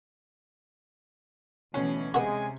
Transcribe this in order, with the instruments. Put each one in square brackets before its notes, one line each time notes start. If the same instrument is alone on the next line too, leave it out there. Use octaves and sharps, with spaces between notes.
[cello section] D2 B2 E3 [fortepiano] C#4
[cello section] C3 [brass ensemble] G#3 G#5 [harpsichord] B3 F#4